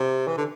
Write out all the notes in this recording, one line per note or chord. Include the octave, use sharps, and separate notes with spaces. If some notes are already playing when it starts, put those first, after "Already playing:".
Already playing: C3
E3
D3